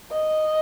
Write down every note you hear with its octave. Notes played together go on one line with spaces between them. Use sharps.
D#5